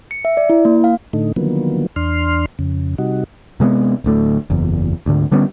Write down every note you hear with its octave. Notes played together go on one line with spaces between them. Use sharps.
C#7
E5
D5
E4
A#3
F5
A2 D3 A3 D#4
D3 D#3 F3 F#3 A#3 B3
E2 D4 C6 F6
F2 C#3
C3 G3 D#4 F#4
C3 G#3 A#3 B3
D1 D2 A3
F#1 E2
D2 G#2 D3
D3 G3 B3 C#4